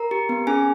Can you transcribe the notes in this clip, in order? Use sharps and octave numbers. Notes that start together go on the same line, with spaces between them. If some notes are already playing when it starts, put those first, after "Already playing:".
Already playing: A#4 A#5
G4
B3
C#4 G#4 G#5